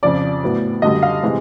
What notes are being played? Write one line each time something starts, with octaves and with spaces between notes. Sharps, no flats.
F2 C#3 F3 D5
A2 F#3 B3
F#2 D3 G3 D#5
F5
C3 E3 G#3